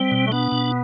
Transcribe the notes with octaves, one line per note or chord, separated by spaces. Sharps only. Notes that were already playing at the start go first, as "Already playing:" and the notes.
Already playing: G3 C4
B2
A3
B3 D4
B2